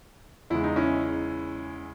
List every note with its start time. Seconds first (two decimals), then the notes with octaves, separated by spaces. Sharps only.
0.50 E2 C#3 G#3 E4
0.64 D#4
0.76 C#4 E4